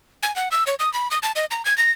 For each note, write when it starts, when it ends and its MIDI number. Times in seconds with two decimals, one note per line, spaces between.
0.23 0.34 80
0.36 0.49 78
0.52 0.64 88
0.67 0.75 73
0.79 0.92 87
0.94 1.08 83
1.11 1.18 87
1.23 1.32 81
1.36 1.45 75
1.51 1.64 82
1.65 1.76 92
1.78 1.91 94